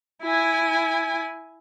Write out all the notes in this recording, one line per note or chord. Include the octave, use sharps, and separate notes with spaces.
E4 G#5